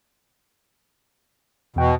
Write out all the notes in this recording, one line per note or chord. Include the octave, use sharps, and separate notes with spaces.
E2 B2 G5